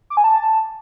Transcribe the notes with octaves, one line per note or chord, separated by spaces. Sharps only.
D6
G#5
A5